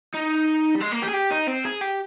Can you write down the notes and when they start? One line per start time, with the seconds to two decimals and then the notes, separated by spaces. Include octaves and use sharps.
0.14 D#4
0.75 G3
0.81 G#3
0.92 A#3
1.03 G4
1.09 G#4
1.14 G4
1.31 D#4
1.48 C4
1.65 G#4
1.81 G4